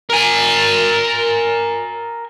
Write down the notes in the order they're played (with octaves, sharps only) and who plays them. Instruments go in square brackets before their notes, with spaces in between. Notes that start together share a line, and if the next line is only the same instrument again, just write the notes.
[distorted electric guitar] A#4 G#5